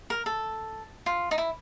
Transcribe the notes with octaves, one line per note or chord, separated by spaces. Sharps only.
A#4
A4
F4
D#4
E4